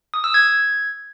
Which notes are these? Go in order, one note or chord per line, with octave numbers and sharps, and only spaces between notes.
D#6
E6
G#6